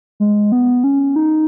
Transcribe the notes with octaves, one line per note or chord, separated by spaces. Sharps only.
G#3
B3
C#4
D#4